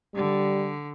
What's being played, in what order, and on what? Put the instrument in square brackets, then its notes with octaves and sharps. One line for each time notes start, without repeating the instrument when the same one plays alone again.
[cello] D3 [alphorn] G3